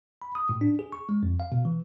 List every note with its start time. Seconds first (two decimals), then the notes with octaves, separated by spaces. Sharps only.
0.22 B5
0.35 D#6
0.49 A2
0.61 D4
0.79 G#4
0.92 C#6
1.09 G#3
1.23 F2
1.40 F5
1.52 B2
1.65 E3